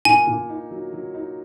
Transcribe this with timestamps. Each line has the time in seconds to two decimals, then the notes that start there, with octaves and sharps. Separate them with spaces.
0.05 A#2 G#5
0.27 A#2
0.49 D#4
0.71 F#3
0.93 F#3
1.14 D#4